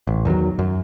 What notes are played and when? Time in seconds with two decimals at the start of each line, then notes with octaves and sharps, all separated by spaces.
0.07 A1
0.25 E2 D#3 E3 F#3
0.59 F#2